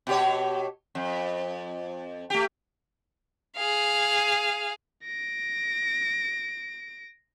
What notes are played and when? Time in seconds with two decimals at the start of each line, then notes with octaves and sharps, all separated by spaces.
0.07 B2 G4 C#5
0.95 F2
2.30 A3 G4
3.56 G#4 F5
5.04 A#6 D7